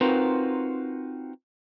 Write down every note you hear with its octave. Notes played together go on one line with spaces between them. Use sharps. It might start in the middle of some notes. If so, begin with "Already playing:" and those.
C4 D#4 F4 F#4 A#4 B4